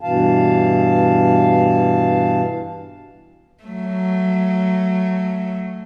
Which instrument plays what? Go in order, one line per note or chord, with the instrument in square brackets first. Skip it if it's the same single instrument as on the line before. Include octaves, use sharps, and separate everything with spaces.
[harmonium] G2 B2 E3 F5 A5
[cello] F#3 A3